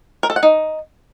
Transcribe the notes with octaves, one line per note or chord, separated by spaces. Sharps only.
A#4
A4
F#5
D#4